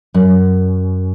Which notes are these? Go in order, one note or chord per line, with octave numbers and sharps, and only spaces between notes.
F#2